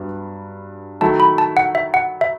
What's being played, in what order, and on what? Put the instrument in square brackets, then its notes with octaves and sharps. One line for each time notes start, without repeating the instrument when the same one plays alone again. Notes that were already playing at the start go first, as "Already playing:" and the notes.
Already playing: [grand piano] G2 F#3 B3
[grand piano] D#3 F#3 A3 E4 [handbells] A5
[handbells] B5
A5
F#5
E5
F#5
E5